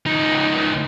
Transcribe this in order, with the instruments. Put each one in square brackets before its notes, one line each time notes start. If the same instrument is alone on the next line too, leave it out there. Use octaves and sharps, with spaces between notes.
[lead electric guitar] C#2 D#4